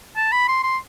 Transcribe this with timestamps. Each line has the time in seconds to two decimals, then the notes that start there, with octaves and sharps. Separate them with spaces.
0.16 A5
0.32 B5
0.48 C6
0.63 C6